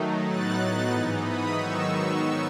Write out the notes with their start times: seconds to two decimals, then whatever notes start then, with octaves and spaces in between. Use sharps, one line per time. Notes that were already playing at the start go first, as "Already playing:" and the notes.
Already playing: D#3 F#3 A3 D#4
0.24 A2 F#3 B3 D#4 F#6 A6
0.90 G#2 E3 B3 D#4
1.22 B5 D#6
1.55 G#2 D#3 F#3 B3 D#4 C#6 E6